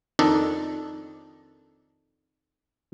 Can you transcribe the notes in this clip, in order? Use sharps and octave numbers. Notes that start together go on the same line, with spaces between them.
F2 D#3 D4 D#4 A4 D5